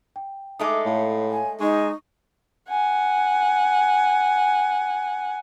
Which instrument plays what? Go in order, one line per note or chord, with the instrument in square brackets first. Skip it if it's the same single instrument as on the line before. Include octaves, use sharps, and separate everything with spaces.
[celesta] G5
[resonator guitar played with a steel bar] G#3 A3 D#4 [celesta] D6 D#6
[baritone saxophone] A2 [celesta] C#5 F5
[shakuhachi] G#5
[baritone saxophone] G#3 [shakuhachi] D#4 [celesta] C#6
[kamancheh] F#5 G#5